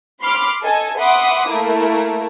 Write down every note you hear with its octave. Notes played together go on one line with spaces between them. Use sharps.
B5 C6 D6 F6
A4 D#5 G#5
E5 F#5 B5 C6 D6 D#6
A3 A#3 E4 A#4